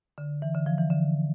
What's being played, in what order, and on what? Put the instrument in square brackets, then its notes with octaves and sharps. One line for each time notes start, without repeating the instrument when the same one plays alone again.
[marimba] D3
E3
D3
F3
E3
D3